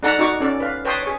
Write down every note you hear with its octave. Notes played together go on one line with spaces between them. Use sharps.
D4 D#4 A4 F#5 A5 A#5
D#4 F#4 A#5 C#6 D6
C#4 A4 D5
B4 F5
B4 C#5 G5 A5 C6 D#6
G#4 C#5